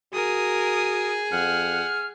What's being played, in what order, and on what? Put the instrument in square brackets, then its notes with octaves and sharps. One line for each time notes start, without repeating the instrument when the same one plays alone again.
[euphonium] F#4 [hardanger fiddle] G#4 [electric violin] A#4 D#6
[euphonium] F2 [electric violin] F#5 [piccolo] F6